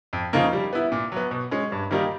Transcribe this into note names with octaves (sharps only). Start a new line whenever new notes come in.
F2
C#3 F3 A#3 D#4
G3
B3 E4
A#2
F#3 B3
B2
G#3 C#4
G2
D#3 G3 A#3 D#4